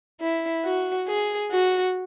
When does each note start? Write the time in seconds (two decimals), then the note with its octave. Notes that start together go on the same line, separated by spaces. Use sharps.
0.20 E4
0.64 F#4
1.07 G#4
1.51 F#4